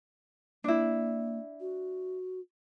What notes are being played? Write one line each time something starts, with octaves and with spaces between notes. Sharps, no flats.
A#3 D4 E4
F#4